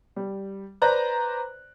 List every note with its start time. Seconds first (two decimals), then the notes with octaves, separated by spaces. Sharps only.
0.16 G3
0.82 B4 C5 D5 A#5 F#6